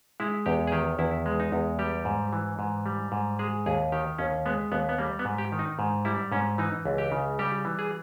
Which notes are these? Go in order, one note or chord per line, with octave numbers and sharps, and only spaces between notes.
G#3 E4
E2 G4
G#4
D#3 G4
E2 E4
G#3
D#4
E2
G3 G4
G#2
E3
G#2
G3
G#2
G#3 G#4
D#2 G#4
D#3 G4
D#2 C#4
G#3 B3
D#2 B3
B3
G3 A#3
B3
G#2
G4
D#3
D#4
G#2
G3 E4
G#2 C#4
E3 D#4
C#2
G4
C#3
G3 G4
E3
G#4